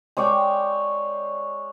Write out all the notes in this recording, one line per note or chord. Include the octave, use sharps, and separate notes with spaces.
G#3 C#5 D5 G5